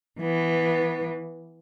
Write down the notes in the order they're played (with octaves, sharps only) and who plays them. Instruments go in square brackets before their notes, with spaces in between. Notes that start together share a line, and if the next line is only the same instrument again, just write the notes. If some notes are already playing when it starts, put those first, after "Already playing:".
[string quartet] E3 B3